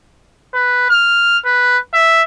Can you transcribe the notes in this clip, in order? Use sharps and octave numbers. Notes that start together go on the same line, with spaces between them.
B4
F6
B4
E5